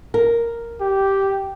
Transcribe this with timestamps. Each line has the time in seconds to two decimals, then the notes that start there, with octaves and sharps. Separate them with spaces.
0.14 A#4
0.81 G4